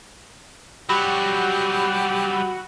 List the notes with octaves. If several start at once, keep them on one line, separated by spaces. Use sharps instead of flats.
F#3 G3 F#4 G4 B5